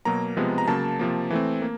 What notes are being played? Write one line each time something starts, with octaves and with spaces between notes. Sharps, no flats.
B2 F#3 A#3 A#5
C3 F3 G#3 B3
A#5
C#3 F#3 A#3 A5
C3 F3 A#3
E3 A3 C4
A#3